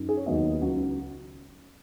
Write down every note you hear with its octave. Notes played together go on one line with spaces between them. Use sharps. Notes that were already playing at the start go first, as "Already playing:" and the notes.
Already playing: F#2 D#4
G#4
C#5
D#2 D#3 F#3 B3 D#5
C#2 C#3 F#3